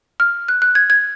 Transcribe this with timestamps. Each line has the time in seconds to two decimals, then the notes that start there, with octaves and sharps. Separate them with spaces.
0.20 F6
0.48 F#6
0.62 F#6
0.75 G#6
0.90 G#6